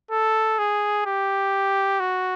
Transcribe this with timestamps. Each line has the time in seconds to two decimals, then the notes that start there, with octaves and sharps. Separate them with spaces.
0.11 A4
0.59 G#4
1.06 G4
2.00 F#4